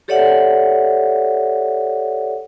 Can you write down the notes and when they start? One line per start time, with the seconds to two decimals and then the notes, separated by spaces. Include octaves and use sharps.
0.08 G4 A4 C#5 D5 E5 F#5